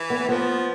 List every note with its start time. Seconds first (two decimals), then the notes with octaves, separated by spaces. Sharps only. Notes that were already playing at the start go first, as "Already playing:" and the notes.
Already playing: E3
0.10 B3
0.29 F3 B3